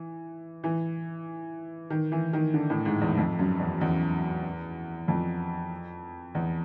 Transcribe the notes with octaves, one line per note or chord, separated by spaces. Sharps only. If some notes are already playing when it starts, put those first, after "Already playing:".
Already playing: E3
E3
D#3
E3
D#3
D3
A2
G#2
E2
F2
F#2
E2
E2
F2
E2